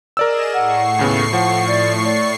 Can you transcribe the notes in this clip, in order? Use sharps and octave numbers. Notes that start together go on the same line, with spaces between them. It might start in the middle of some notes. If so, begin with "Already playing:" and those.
G#4 A#4 D5 D#5 E6 E7
A2 F#5 C#6 C7
D#2 C#3 B3
F3 F#5
D5
D5